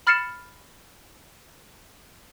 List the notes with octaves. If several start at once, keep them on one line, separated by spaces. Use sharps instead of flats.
B5 F6 A6 C7 C#7 E7